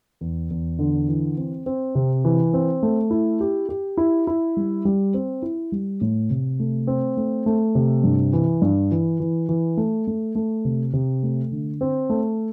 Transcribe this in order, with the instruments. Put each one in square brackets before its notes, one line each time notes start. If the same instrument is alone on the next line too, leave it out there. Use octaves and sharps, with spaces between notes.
[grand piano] E2
E2
D3
E3
C4
C4
C3
E3
C4
A3
E4
G4
G4
E4
E4
G3
G3
C4
E4
G3
A2
C3
A3
C4
A3
A3
C3
G2
E3
G2
E3
E3
E3
A3
A3
A3
C3
C3
A3
D3
C4
A3